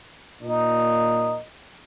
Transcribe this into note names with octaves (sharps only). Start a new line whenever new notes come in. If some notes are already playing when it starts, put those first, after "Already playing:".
A#2 D#4